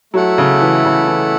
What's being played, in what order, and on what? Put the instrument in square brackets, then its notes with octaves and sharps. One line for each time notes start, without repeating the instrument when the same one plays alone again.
[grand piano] F#3 [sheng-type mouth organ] A3 E4 A4 F#5
[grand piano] C#3
E3
C#3
E3